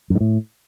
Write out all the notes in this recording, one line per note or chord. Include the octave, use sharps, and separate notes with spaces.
F#2
G#2
A2